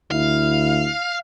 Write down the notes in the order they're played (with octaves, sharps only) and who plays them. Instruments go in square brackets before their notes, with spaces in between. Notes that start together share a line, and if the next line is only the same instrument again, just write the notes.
[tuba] D2 [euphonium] E4 [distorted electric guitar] F5